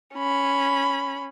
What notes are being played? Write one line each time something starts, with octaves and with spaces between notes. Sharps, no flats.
C#4 B5